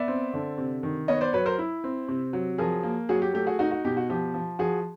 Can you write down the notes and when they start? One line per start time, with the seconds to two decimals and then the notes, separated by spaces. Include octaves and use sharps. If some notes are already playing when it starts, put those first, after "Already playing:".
Already playing: B3 D5 E5
0.08 C4
0.33 D3
0.58 C3
0.83 D#3
1.08 B3 C#5 D#5
1.21 C5 D5
1.33 F#3 B4 C#5
1.46 A#4 C5
1.59 E4
1.84 C4
2.08 C3
2.33 F#3
2.58 F3 G#4 A#4
2.83 A#3
3.09 F#3 F#4 G#4
3.22 G4
3.34 A3 G4
3.46 F#4 G#4
3.59 D#4 F#4
3.71 F#4
3.85 B2 G4
3.97 F#4
4.10 F3 G4
4.34 F3
4.59 F3 F#4 G#4